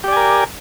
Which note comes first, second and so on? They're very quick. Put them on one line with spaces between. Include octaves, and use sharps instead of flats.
G4 D5 G#5 A#4